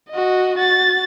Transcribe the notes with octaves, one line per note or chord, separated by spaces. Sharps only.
F#4 D#5
F#4 A6